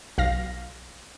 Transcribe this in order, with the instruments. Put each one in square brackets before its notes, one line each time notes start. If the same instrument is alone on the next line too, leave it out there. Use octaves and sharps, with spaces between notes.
[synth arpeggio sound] B1 F5 A#6